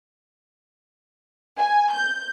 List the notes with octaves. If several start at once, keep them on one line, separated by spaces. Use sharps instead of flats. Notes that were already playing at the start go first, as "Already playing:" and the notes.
G#5
G6